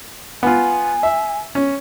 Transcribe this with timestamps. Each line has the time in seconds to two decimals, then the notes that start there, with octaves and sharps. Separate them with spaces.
0.43 B3 F4 G#5
1.03 E5
1.55 C#4